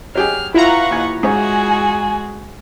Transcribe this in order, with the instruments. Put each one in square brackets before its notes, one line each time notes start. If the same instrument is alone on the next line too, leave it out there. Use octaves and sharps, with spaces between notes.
[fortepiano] F#3 G4 G#4 [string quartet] F6
[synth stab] E4 F4 A#5 [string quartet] B4 F#5 C#6 [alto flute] F5
[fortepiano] D#2 G#5
[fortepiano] G#2 C#5 [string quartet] G#3 F#4 G#4 [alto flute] G#5